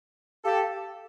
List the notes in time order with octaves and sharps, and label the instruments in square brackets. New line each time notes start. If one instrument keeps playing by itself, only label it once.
[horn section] G4 A4 [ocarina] F5